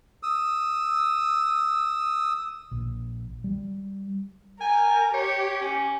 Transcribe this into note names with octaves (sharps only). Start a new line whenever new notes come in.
D#6 E6
A#1
G3
A#4 G#5
G4 C#5
C#4